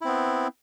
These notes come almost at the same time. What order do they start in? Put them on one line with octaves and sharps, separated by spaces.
E4 C4 B3